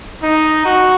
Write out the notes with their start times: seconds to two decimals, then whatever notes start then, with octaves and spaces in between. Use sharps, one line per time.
0.23 D#4
0.65 F#4